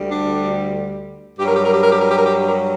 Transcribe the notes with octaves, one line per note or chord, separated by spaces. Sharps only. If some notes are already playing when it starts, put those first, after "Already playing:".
Already playing: D2 D3 G3
D4
G2 F#3 G4 A#4
G4
A#4
G4
A#4
G4
A#4
G4
A#4
G4
A#4